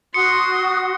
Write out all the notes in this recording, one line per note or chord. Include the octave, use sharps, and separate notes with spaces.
F#4 C6 D#6 C#7